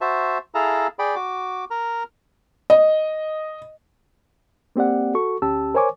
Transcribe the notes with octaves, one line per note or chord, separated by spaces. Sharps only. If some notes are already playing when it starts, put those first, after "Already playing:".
F#4 C5 E5 A5
E4 G#4 A4 F5 A5 A#5
G#4 D5 G5 B5
F#4 D6
A#4 A#5
D#5
A#3 C4 G4 D5 F#5
F#4 A4 C#6
D2 C#4 G4 A5 E6
A#4 C5 C#5 G#5 C#6 D6